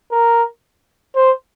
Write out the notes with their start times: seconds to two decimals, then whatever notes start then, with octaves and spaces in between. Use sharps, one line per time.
0.12 A#4
1.15 C5